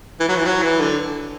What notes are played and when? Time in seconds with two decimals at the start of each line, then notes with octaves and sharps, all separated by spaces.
0.20 E3
0.29 F#3
0.37 E3
0.45 F#3
0.62 E3
0.80 D3